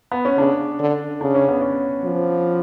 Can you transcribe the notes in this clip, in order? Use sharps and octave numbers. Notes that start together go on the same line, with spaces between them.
B3
C#4
C#3 D4
D3
C#3 D4
C#4
B3
C#4
F3